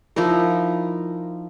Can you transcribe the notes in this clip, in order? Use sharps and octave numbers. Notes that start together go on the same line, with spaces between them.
F3 D#4 E4 A#4